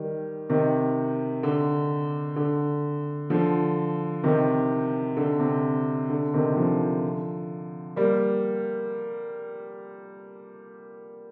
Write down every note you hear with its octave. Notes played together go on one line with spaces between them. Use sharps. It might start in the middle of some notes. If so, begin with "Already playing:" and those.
Already playing: D#3 G3
C3 D#3
D3
D3
D3 F3
C3 D#3
D3
C3
D3
C3 D#3
D3 F3
G3 A#3